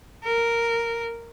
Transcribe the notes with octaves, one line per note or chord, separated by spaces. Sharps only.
A#4